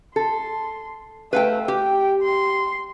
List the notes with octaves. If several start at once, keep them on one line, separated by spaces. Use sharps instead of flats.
A4 C6
A3 B4 F5 G5
G4 G5
C6